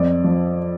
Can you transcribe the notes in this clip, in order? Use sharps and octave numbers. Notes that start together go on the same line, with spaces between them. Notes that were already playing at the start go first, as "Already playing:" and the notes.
Already playing: F2 D5
F3